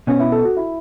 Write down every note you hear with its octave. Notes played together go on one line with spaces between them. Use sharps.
B2 B3 C#4 F#4
E4
A4
F#4
E4